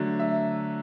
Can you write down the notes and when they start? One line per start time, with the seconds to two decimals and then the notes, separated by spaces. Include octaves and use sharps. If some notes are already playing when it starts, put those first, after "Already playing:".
Already playing: D3 F#3 A3
0.19 E5